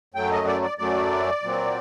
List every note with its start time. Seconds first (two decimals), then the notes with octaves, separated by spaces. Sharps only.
0.14 F#2 F#3 A3 G5
0.31 D#5
0.47 D5
0.62 D5
0.78 F#2 F#3 A3 D5
1.42 A#2 F#3 C4